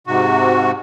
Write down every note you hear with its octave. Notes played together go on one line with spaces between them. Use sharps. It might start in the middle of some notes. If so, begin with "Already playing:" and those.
G#2 C3 F#4